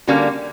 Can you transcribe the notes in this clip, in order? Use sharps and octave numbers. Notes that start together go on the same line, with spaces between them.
D3 G3 A#3 C#4 F#4